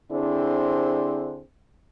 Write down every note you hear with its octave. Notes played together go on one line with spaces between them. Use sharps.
D3 C4 D4 E4 G#4 C5